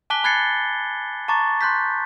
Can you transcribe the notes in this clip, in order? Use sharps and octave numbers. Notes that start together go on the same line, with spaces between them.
G#5 A5 D6 F#6 B6 G7
B5 F#6 G#6 A6 C7 C#7
A5 A#5 C#6 D6 A6
C6 F#6 G6 B6